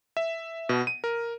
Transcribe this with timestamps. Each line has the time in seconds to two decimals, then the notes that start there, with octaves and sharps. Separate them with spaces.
0.17 E5
0.69 B2
0.87 D#7
1.04 A#4